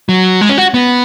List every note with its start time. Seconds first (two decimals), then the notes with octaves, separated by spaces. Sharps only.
0.09 F#3
0.41 G#3
0.50 C#4
0.58 F#4
0.74 B3